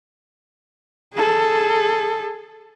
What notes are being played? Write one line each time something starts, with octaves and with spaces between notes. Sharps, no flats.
G#4 A4